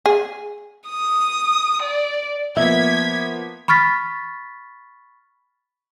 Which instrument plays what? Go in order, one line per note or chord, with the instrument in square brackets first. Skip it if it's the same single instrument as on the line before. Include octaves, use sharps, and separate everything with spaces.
[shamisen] G#4
[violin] D#6
D5
[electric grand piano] F3 A#3 B3 [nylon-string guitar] E5 [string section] G#6 B6
[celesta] B5 C#6 F6 A6 B6